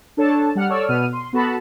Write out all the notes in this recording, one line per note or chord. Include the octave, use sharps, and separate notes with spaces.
D4 A4 C#5 A5
G3 F#5 F6
A4 C#5 D5 C#6 E6 F6
B2 B3 F6 D#7
C6
B3 F#4 A4 A5 B5